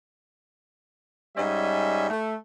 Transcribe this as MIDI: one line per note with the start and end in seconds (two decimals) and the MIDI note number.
1.37 2.09 44
1.37 2.09 55
1.37 2.09 61
1.37 2.09 75
1.37 2.09 76
2.10 2.35 57